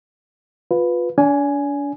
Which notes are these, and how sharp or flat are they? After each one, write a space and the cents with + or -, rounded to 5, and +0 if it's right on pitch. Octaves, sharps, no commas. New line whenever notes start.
F4 +25 B4 +0
D4 -40 G#5 +5